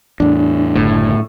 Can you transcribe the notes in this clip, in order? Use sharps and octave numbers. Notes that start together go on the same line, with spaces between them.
E2 A2 D4
F#1 A2 D3